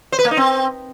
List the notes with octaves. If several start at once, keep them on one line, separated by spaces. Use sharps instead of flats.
C5
B4
A#3
D#4
C4